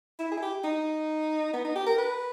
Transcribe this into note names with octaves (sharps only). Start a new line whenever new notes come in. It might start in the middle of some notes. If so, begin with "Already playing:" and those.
E4
G#4
E4
G4
D#4
B3
D#4
G4
A#4
B4